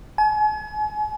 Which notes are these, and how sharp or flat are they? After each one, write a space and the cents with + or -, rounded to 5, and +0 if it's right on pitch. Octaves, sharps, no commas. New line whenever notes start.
G#5 +40